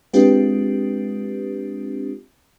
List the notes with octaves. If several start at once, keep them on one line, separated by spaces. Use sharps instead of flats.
G#3 C4 D4 F4 G4 B4